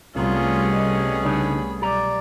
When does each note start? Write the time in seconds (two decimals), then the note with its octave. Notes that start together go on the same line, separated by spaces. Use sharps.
0.16 C2 C3 G3 A3 B3 C#4 F4 G#4
0.75 D#5
1.25 C#3 D4 D#4 B5
1.82 B1 G4 D5 A#5